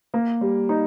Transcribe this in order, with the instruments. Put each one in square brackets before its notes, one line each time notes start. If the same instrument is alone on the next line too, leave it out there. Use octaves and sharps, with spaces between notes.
[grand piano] A#3
G3
D#4